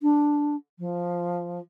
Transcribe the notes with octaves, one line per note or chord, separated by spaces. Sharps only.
D4
F3